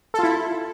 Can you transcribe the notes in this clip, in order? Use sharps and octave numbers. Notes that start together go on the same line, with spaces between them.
E4 F4 A4